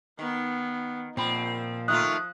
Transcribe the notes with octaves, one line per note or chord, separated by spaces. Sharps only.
D#3 B3
A#2 F3 C4 B5
D#3 A3 F4 D#6 F#6